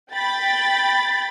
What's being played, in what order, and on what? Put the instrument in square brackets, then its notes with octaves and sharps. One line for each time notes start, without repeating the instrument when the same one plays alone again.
[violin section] G5 B5 A6